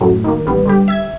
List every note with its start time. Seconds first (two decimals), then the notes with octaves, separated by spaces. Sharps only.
0.01 F#2 A2 F#3
0.24 D#3 A#3
0.46 A1 G3 B3
0.66 D3 G3 G4
0.88 E5 E6 G#6